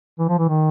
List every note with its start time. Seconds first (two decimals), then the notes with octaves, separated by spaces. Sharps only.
0.19 E3
0.29 F3
0.39 E3
0.48 D#3